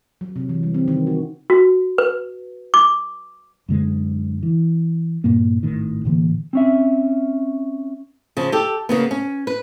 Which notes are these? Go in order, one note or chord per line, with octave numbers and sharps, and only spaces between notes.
F#3
C3
E3
G3
C4
D#3
F#4
F#4
B4
D6
F#2 D3 G#3
E3
G2 A#2 A#3
G#1 A2 D#3
A2 D3 E3 A#3
C4 C#4 E5
C#3 F3
G4 A4
C#3 A#3 B3
C#4
B4